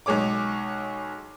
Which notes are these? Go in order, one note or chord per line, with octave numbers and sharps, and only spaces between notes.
B1 G#3 G#4 C#5 D6